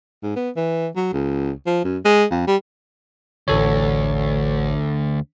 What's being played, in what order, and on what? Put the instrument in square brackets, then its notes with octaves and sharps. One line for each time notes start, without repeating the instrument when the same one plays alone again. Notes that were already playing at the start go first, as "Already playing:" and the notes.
[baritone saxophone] G#2
B3
E3
F#3
C#2
F3
F#2
G#3
F2
G3
[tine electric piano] A1 A4 C#5 [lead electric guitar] D2